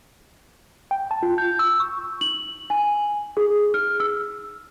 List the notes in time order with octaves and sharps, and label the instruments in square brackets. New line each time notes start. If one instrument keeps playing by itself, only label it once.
[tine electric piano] G5
A5
F4
G6
E6
C#6
[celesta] F#7
G#5
G#4
F6
E6